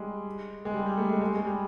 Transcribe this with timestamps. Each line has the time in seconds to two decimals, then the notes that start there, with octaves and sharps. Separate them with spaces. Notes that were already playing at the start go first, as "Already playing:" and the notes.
Already playing: G3 G#3
0.65 G#3
0.74 G3
0.86 G3
0.98 A3
1.09 G#3
1.21 G#3
1.35 G#3
1.45 G3